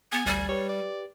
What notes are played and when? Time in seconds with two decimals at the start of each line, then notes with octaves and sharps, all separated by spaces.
0.12 B3 G#5
0.26 A1 D2 G3
0.49 G4 B4 C#5
0.69 D5